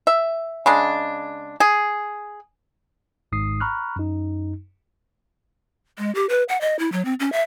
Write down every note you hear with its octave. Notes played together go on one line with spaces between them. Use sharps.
E5
C#3 G#3 D4
G#4
G#1 G#2 D#6 C7
A#5 B5 C#6 F6 F#6
F#2 D#4
G#3
G4
B4
F#5
D#5
E4
F#3
C4
C#4
E5